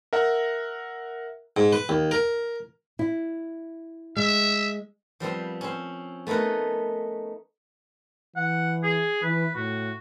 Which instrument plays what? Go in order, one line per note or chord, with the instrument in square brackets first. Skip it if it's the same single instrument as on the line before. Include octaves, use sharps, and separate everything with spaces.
[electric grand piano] A#4 E5 F#5 A#5
[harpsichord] G#2
B4
D#2
A#4
[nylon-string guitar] E4
[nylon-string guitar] G#3 [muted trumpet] E5
[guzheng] F3 G3 B3 C4
C4 C#4
A3 B3 D#4 A#4 B4
[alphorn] E3 [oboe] F#5
[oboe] G#4
[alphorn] E3 [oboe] B4
[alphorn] A2 [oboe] F#4